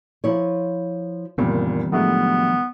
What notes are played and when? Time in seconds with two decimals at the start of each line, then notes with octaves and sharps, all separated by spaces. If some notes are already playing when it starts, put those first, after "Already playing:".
0.24 F3 E4 C#5
1.38 F#1 A#2 D#3 E3 G3 B3 C4
1.92 A2 F3 F#3 G#3 A3 B3 D4